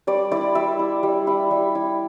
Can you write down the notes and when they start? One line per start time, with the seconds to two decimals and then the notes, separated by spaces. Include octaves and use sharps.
0.07 G3 D5
0.32 E4 D5
0.55 G3 E5
0.79 E4
1.03 G3
1.27 E4
1.51 G3
1.75 E4